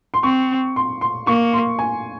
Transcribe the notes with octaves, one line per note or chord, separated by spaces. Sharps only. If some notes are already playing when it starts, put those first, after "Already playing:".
C6
C4 C#6
C6
C6
A#3 C#6
C6
G#5